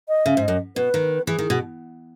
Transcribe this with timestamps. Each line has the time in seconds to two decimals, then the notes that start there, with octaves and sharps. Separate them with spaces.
0.08 D#5
0.25 C#3 E5
0.37 G#2
0.42 D#5
0.48 F#2
0.76 B2 B4
0.94 D#3
1.27 E3 G#4
1.39 D#3
1.50 B2